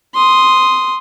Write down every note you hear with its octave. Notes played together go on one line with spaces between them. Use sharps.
C6 D#6